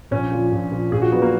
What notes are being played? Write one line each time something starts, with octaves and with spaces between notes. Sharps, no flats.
A#1 C#4
A#2 F3
A#1
A#2 F3
A#1 G#4
F#4
A#2 F#3 B3
A#3